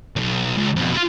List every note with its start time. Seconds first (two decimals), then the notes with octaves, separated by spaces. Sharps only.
0.16 B1 E2
0.57 C#2
0.76 F2 B2
0.92 E4 F4